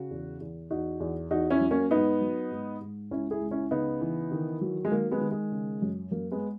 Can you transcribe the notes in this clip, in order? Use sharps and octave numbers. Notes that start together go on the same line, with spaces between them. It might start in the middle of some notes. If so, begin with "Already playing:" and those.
Already playing: C#3 F#4
E2
E2
E2 D#4 F#4
E2
E2 D#4 F#4
C#4 E4
F#3
A#3 C#4
G#2 B3 D#4
F#3
G#2
G#2
C#2 C#4 E4
E4 G#4
C#2
C#4 E4
C#3 B3 D#4
E3
D#3
F#3
G#3
D#3 A#3
G#3 B3
D#3
G#3
C#3
F#2
F#2 A#3
G#3 B3